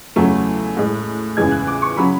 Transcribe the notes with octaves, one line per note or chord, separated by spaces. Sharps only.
E2 C#3 F#3 A3
A2 G#3
E2 C#3 E3 G#3 G#6
F#6
D6
C#6
C#3 F#3 B5